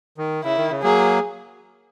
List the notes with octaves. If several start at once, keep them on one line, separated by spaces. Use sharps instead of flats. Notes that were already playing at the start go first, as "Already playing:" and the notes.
D#3
C#3 E4
D#3
C#3
F#3 A#3 G#4